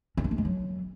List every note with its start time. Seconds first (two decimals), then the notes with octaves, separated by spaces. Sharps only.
0.17 C#4
0.24 D4
0.31 A#3
0.38 G#3
0.45 F#3